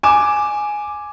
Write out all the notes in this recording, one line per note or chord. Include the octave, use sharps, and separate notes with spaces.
G#5 D6 E7